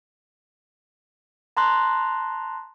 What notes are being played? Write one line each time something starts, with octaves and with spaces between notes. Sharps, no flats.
A5 A#5 C6 F#6